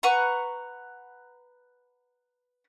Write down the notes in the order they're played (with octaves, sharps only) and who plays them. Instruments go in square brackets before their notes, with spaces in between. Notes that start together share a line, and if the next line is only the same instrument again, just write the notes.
[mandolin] B4 F#5 A#5 C#6